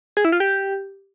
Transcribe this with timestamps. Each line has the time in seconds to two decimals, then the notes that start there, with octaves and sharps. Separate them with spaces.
0.17 G#4
0.25 E4
0.32 F4
0.40 G4